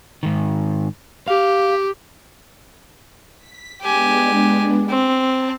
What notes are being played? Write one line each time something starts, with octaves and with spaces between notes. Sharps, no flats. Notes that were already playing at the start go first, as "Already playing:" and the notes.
G#2 D#3
G4 F5
B6
G#3 B3 D4 G4 G#5
C4
A5